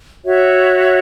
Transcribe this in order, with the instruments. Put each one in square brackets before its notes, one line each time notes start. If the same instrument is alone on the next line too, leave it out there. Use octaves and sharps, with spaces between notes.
[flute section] F#4 C#5 E5